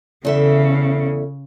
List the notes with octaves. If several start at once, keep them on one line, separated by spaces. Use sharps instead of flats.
E2 C#3 A4 E5